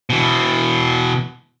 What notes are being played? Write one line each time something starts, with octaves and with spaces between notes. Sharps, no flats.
B2 E3